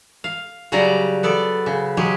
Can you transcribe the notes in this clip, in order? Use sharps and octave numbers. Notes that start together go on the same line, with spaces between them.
F5
C#3 F#3 G3 D5 A#5
B3 A4 D5
C#3
F#3 G#3 G4 G#4